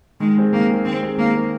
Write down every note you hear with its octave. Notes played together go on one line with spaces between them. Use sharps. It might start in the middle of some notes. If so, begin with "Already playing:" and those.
D#3 G#3
G#3 C4
D#3 A#3
G#3 C4
D#3 C4
G#3 C4
D#3 A#3
G#3 C4